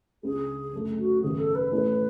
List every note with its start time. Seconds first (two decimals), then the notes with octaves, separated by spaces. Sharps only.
0.23 C#2 C#3 G#3 D4 G#4
0.73 F#2 D3 A3
0.98 F#4
1.22 G#1 F#2 C#3 G#3 B3 G#4
1.39 A4
1.55 B4
1.72 A2 E3 A3 C#4 E4